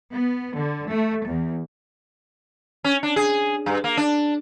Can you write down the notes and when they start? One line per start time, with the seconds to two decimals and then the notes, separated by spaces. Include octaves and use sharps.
0.13 B3
0.54 D3
0.90 A3
1.27 E2
2.84 C#4
3.03 D4
3.16 G#4
3.66 G2
3.84 A#3
3.97 D4